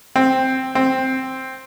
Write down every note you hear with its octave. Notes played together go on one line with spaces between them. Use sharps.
C4
C4